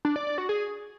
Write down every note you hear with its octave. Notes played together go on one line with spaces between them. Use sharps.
D4
D5
D5
F#4
G#4